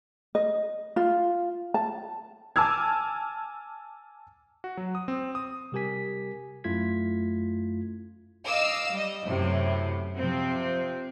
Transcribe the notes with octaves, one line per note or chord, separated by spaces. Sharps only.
D#5
F4
A5
G#5 A5 D6 E6 F6 G#6
F#4
F#3
D#6
C4
D#6
C3 G3 G4 A#4 G#5 B6
F#2 A3 E4 F4 G#6 B6
D#5 F5 D6 E6
G3 D#5
F#2 A2 C3
C3 F3 C4